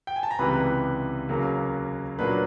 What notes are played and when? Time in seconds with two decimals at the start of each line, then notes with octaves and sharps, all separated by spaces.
0.07 G5
0.16 G#5
0.23 A5
0.31 A#5
0.39 C#2 C3 E3 G3 B4 B5
1.29 D#2 C#3 F#3 A#3
2.19 A#2 F#3 A#3 D4 B4 B5